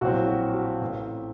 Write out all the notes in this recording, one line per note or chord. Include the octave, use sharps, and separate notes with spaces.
A#1 A2 F#3 C4 F#4
F#4
F#4
A1 A2 A3 C4